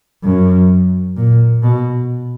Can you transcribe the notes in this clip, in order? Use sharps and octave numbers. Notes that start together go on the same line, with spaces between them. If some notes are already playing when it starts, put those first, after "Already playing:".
F#2
A#2
B2